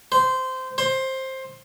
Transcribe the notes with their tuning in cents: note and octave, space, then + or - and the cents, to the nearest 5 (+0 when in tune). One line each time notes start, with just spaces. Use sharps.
C5 -15
C5 +15